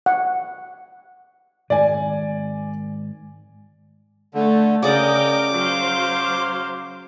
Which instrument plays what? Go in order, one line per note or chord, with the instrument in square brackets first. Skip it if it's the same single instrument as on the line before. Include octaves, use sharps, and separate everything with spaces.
[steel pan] F#5
[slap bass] G#2 D#3 G#3 [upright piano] D5 G#5
[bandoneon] D3 [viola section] A3
[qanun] C#3 D5 F#5 [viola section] A#4 D#5 G5 [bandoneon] D6
[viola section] F#3 C5 F5